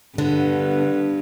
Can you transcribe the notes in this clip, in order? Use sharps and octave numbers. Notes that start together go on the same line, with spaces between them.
G2 D3 B3